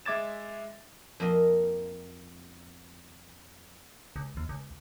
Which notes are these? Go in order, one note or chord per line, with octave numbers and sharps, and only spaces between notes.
G#3 E5 D6 G#6 A6 E7
F2 A#3 A#4 D#5
C#2
D#2
C#2